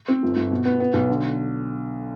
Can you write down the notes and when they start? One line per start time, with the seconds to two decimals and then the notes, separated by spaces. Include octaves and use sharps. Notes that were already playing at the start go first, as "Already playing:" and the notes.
0.08 C4
0.23 G1
0.36 G1
0.51 B2
0.65 B3
0.80 B3
0.94 B1
1.09 D3